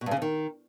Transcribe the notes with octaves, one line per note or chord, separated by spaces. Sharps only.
B2
G2
C#3
F2
D#3